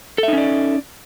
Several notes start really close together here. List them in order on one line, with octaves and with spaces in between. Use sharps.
A4 E5 D#4 C#4 D5